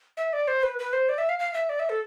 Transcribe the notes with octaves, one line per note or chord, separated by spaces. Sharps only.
E5
D5
C5
B4
B4
C5
D5
E5
F5
F5
E5
D5
E5
A4